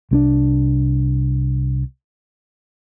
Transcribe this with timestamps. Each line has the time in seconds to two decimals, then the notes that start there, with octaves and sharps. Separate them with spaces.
0.11 C2 C4 D4